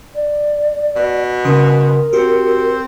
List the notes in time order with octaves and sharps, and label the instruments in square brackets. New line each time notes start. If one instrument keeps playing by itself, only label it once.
[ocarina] D5
[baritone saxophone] B2
[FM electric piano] C#3 C6 D#6 [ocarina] A#4
[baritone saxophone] C4 [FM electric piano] F#4 G4